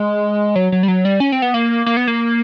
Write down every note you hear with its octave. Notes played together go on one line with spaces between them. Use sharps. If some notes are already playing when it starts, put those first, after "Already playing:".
Already playing: G#3
F#3
F#3
G3
F#3
G3
C#4
C4
B3
A#3
A#3
B3
A#3